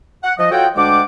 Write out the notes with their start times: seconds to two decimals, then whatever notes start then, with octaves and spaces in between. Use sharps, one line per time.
0.24 F#5
0.38 F3 D#5
0.52 F4 F#4 A4 C#5 F#5 G5
0.76 D2 G#3 D4 F#5 G5 D6